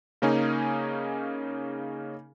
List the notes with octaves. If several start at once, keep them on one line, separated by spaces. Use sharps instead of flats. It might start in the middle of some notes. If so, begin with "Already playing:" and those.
C#3 A#3 C#4 D#4 G#4